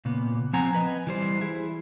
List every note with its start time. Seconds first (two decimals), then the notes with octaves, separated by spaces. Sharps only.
0.05 A#2 C#3 A#3 B3
0.53 F3 C4 F#5 G#5 A#5
0.75 B4 D#5 G#5
1.07 E3 G3 C5
1.41 E4 G#4